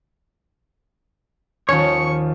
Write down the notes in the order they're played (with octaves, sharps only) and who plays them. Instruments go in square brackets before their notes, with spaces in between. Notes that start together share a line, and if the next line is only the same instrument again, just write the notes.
[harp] D#2 D#3 [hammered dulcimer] F3 C#4 [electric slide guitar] C#5 [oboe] C#6